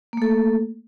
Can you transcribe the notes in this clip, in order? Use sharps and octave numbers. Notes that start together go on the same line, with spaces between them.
A3 A#3 A4